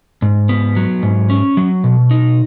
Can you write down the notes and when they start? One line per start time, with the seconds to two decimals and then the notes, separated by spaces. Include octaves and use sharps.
0.22 G#2
0.49 B3
0.76 F#3
1.03 G#2
1.30 C#4
1.57 F#3
1.84 B2
2.11 D#4